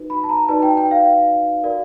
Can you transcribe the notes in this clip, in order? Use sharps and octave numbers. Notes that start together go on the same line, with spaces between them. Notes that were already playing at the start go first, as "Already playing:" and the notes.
Already playing: D#4 F#4 B4
B5
A5
A#5
D#4 F#4 B4 D5 A5
G5
G5
F5
F#4 A#4 D5